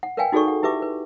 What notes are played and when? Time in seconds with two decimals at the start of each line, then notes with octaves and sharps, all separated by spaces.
0.03 F#5
0.17 A#4 B4 D5 F5 G5 G#5
0.32 D#4 F#4 G#4 A4 D5 C#6
0.48 F#5
0.63 E4 G4 B4 E5 D6
0.82 B4